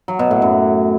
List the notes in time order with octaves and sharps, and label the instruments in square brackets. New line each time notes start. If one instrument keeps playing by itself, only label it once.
[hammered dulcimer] F#3
B2
A2
F#2